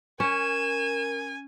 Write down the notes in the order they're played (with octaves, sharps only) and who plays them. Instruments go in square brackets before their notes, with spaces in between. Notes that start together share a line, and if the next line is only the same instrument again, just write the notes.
[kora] C#4 [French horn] A#4 [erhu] G#5 [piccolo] E7